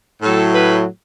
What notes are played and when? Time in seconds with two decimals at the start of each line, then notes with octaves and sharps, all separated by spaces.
0.22 A2 F#3 A4
0.53 B4